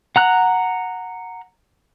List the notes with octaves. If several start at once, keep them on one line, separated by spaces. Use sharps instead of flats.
F#5 A#5 F#6